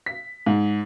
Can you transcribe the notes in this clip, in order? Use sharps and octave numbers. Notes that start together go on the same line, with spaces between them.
B6
G#2